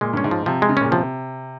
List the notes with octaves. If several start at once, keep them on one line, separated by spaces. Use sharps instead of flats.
A#2 G#3
G2 C#4
G#2
F3
C3 F3
G#3
C#3
A#2 C#4
C3 F3